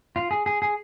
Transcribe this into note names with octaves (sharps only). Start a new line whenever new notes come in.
F4
G#4
G#4
G#4